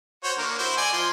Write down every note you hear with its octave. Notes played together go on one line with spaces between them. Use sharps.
F#4 C5 C#5
D3 A#3 A#4
E4 F#4 C5
D5 D#5 G#5
F3 C6